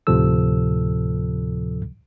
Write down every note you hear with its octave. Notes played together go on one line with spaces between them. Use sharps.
D2 A2 C3 F3 A4 E6